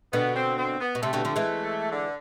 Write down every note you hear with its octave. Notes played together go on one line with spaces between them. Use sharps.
B2 D3 B3
C4
C4
B3
B2
C3 A3
B2 D3
D3 F3
E3 G#3
D3